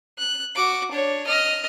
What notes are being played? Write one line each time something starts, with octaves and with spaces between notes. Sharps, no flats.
F#6
F#4 D6
D4 C#5
D#5 F6